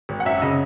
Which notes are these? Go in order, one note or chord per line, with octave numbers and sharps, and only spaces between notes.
G#1
F#5
F#2 E5
C#3 D#5